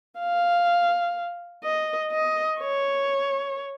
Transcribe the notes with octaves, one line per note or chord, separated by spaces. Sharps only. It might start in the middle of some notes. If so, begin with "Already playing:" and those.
F5
D#5
D#5
C#5